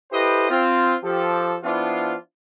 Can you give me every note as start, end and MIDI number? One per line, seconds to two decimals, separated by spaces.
0.12 0.46 64
0.12 0.46 67
0.12 0.46 69
0.12 0.46 71
0.12 0.46 72
0.12 0.46 75
0.50 0.95 60
0.50 0.95 65
1.03 1.56 53
1.03 1.56 67
1.03 1.56 69
1.63 2.15 53
1.63 2.15 59
1.63 2.15 62
1.63 2.15 64
1.63 2.15 65